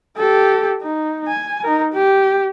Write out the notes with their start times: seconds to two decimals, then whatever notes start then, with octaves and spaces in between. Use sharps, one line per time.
0.16 G4 A4
0.82 D#4
1.28 G#5
1.63 D#4 A#4
1.93 G4